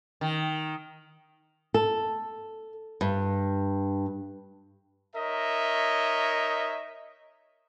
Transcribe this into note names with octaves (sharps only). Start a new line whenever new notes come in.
D#3
A4
G2
D#4 A#4 C#5 D#5 E5